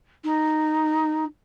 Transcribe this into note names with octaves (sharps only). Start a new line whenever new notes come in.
D#4